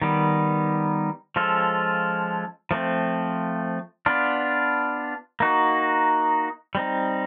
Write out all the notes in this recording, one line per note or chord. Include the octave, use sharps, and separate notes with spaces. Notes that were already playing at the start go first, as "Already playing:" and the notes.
D#3 G3 B3
F3 G#3 C#4 F4 A4
F3 A3 C4
B3 D4 F4
A#3 D#4 F#4
G3 C4 D#4